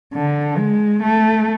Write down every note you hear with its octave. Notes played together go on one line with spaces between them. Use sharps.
D3
G#3
A3